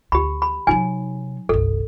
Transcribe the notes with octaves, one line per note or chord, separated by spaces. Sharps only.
D2 G4 B5
B5
C3 F#3 D#4 G#5
G1 C2 A4